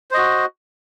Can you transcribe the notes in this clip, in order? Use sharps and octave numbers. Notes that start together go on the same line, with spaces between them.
F#4 C5 D#5